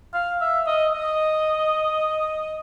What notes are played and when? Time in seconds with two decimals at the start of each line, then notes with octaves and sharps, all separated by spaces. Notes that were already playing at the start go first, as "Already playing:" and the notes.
0.14 F5
0.41 E5
0.67 D#5
0.94 D#5